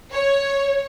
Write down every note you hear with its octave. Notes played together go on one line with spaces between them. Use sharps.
C#5